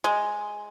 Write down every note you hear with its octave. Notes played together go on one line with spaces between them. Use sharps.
G#3